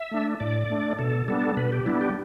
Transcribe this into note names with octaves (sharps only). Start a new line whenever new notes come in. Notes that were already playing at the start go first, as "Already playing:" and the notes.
Already playing: E5
A3 D4
A2 D5
A3 D4
B2 A4
G3 B3 D4 A4
B2 B4
G4
G3 B3 D4 E4
G4